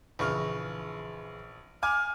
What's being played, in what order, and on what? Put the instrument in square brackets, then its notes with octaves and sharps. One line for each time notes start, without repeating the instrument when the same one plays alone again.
[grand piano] A#1 C#6 F6 [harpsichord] C#3 E3
[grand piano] G#5 D6 [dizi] F6